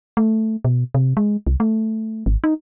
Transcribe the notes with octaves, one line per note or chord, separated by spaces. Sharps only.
A3
B2
C3
G#3
C2
A3
G#1
D#4